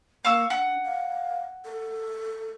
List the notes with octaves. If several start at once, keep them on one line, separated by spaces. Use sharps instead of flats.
A#3 F5 C#6 E6
D4 F#5
F5
A4